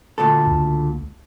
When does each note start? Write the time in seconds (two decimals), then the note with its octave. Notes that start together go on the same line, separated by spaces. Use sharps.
0.18 D2 A#2 A4
0.47 C#2